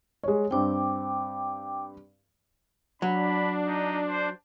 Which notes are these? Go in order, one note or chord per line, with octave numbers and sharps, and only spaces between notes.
G#3 C#5
G2 C4 G5 D6
F#3 D4 B5
D#4
C5